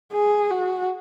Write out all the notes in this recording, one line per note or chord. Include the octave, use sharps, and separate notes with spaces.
G#4
F#4